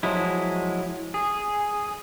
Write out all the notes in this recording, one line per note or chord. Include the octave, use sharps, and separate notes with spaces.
F3 F#3 G#3 E4
G#4